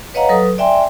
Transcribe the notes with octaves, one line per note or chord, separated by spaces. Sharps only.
B4 C#5 D#5 F5 F#5 A#5
F#3 A4 B4 D#6
D5 E5 G5 G#5 C6